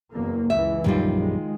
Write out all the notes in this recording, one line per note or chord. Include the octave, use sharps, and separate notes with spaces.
F#1 E2 A#3
C#2 E3 E5
A#1 F#2 D#3 G3 D#4 F4
G#3